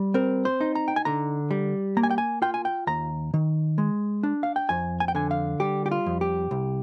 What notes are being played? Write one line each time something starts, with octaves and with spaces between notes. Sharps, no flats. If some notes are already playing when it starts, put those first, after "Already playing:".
Already playing: G3
C4 A#4
C5
D#4
A#5
G5
G#5
D3 A#5
G3
A#3 A#5
G#5
G5
G#5
F4 G5
G#5
G5
D#2 A#5
D#3
G#3
D4
F5
G5
F2 G#5
G#5
G5
D3 G#5
F5
G3 G4
G4
F4
F2
G4
C2